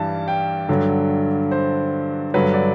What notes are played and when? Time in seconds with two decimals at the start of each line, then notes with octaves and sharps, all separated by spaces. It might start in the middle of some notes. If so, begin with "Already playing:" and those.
Already playing: G2 E3 G3 A5
0.28 G5
0.69 G2 D3 F#3
1.51 C5
2.34 G2 D3 F#3 B4
2.54 D5